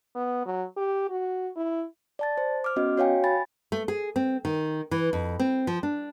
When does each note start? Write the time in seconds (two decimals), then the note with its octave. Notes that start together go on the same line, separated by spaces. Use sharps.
0.15 B3
0.46 F#3
0.77 G4
1.10 F#4
1.56 E4
2.19 D5 A5 A6
2.37 C5
2.64 D6 F6
2.76 B3 C#4 F#4 D#5
2.97 F#4 C#5 F5 G5 G#5
3.24 G#5 B5 A6
3.72 A3
3.88 G#4
4.16 C4
4.45 D#3
4.91 E3
5.13 F2
5.39 C4
5.67 F3
5.83 D4